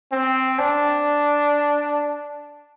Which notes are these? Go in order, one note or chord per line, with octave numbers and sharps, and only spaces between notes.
C4
D4